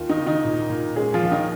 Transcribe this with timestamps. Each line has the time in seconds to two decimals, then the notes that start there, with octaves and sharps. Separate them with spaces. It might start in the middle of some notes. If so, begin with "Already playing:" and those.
Already playing: D#2 F4
0.09 D#3 D#4
0.18 C#3
0.26 D#3 D#4
0.45 A#2
0.70 A#2
0.96 G#3 C#4 G#4
1.14 F3 F4
1.23 D#2
1.31 D#3 D#4